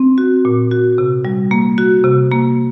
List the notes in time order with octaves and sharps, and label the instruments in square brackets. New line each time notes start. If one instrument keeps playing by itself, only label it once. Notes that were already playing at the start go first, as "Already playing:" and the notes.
Already playing: [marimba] C4
F#4
A#2
F#4
C3
G3
A#3
F#4
C3
A#3